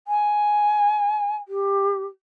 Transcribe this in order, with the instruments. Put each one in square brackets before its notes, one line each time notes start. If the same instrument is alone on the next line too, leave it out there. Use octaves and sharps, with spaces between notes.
[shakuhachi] G#5
G4